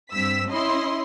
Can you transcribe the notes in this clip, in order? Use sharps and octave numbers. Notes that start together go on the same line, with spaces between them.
G2 C4 E6 B6
C#4 E4 D#5 C6